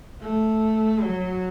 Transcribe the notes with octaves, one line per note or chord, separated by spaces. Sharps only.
A3
F#3